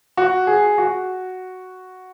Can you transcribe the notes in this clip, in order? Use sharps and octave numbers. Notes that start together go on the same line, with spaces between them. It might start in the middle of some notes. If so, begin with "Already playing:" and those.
F#4
G#4
F#4